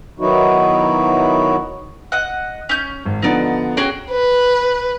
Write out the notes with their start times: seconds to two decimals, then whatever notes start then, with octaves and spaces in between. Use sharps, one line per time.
0.20 D#3 F#3 B3 D#4 E4 F#4
2.12 D#5 F#5
2.69 C#4 G6
3.06 G#1
3.22 D3 F3 B3 D#4 D5
3.77 C#4 F#4 G#4 G5
4.11 B4